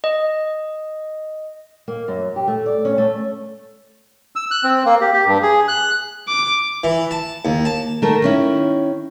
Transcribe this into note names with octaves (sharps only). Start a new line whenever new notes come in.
D#5
A#3
F#2
G4
A3
D5
C#4
A3
E6
F#6
C4
A#3
G4
G4
G2
G#4
F#6
D6
E3
A5
D#2
A5
D#3 A3 A#4
D#3 C#4 E4